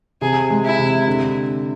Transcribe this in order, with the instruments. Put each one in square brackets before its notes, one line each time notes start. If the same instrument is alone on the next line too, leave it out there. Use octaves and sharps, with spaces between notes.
[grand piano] C3 [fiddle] G#4
[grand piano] G#3
[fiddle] E4
[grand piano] C3
D3